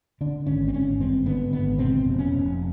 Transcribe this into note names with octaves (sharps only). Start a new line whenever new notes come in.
D3 D4
G#1 C#4
C4
G#1 C#4
G2 C4
D3 B3
G#1 B3
B2 C4
F1
C#4
F1